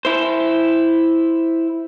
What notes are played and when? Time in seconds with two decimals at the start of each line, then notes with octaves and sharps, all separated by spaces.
0.05 E4 C5